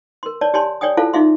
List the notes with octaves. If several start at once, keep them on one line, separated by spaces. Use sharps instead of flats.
A#4 C6
C#5 D5 A5
G4 C#5 D5 G#5 A5 C6
C#5 D5 G5 G#5 D#6
E4 F4 A4 C5 F5 A5
D#4 F4 G#4 E5 F5 C6